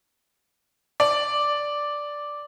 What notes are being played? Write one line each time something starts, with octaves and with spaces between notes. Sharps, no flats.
D5